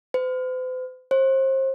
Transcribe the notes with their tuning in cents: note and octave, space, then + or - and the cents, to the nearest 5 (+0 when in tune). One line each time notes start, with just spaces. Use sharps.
C5 -45
C5 +30